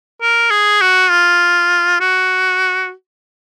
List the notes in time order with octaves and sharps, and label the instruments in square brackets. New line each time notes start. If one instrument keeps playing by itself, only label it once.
[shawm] A#4
G#4
F#4
F4
F#4